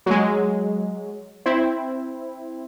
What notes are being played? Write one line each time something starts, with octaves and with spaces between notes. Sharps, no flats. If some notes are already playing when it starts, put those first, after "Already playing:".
F#3 G#3
C4 E4